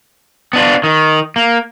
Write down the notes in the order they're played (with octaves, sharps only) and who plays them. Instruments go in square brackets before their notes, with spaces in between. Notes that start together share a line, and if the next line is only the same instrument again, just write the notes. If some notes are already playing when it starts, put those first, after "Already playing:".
[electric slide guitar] B3 D4 F4
D#3
A#3